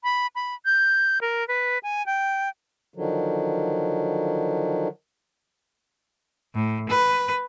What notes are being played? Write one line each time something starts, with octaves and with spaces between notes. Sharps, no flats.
B5
B5
G6
A#4
B4
G#5
G5
D3 D#3 F3 F#3
A2
B4